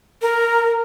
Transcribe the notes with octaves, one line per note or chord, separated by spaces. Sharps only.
A#4